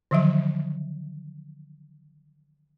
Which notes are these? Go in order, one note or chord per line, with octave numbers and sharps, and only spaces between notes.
D3 D#3 F3 F#3 E5